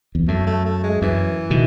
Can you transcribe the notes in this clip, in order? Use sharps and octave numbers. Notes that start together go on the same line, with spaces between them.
E2
F#2 A3
A3
A3
G#3
F#2 E3
B2 D#3